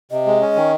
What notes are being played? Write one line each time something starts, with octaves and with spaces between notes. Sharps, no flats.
C3 D#5
G#3
C#4
D#3